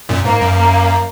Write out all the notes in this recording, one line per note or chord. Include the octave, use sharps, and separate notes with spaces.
F#2 A#2
G#2 A#3
F#2
A#3